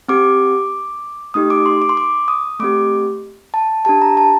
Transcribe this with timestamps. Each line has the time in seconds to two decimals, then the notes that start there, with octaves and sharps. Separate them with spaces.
0.08 C4 G4 D6
1.34 A3 D#4 G4 D#6
1.50 D6
1.66 C6
1.82 D6
1.89 C6
1.97 D6
2.28 D#6
2.60 A3 C4 G4 D6
3.54 A5
3.85 D4 G4 A5
4.02 A#5
4.17 A5